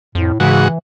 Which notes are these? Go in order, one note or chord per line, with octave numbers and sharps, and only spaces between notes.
F2 A2
G#2 C#3 E3 F#4